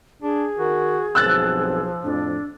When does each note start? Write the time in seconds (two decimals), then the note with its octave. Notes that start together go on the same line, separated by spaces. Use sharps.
0.22 D4 G#4
0.58 D#3 F#4 A#4
1.15 B1 G2 F3 C4 E6 F#6 A6
2.03 F2 A2 D4